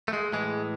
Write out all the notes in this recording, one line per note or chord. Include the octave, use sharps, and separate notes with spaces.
A3
G#3
A2 E3 G#3